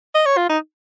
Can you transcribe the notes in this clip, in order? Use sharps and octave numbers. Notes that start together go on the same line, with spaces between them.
D#5
C#5
F4
D#4